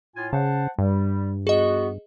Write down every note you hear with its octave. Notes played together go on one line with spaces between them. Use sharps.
A2 F4 G#5
C#3 C5 F#5 A5
G2 G3
B3 F#4 G#4 D#5